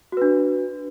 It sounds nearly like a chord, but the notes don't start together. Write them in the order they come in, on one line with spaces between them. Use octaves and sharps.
F#4 B4 D4